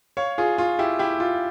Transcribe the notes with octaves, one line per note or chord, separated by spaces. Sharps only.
C#5 F5
F4 G#4
F4
E4 G4
E4 G4
F4